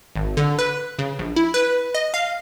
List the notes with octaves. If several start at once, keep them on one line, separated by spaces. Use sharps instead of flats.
G#1
D3
B4
C#3
A#1
E4
B4
D#5
F5